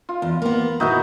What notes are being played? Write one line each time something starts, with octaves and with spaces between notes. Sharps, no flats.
F4
E2
A#3 B3
A#2 D#3 B3 D#4 E4 F#4